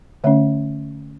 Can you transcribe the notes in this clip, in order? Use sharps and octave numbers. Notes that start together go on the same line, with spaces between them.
D3 A3 C#4 C#5 E5